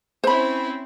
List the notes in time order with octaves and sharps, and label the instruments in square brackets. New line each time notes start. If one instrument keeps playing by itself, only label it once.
[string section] C4 C#4 E4 [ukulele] C5 B5